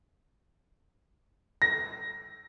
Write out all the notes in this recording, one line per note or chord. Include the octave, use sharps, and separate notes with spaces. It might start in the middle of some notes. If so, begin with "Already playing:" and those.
A#6